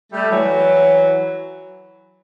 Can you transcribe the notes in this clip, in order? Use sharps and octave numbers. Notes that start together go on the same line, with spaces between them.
G3 A3
E3 F#3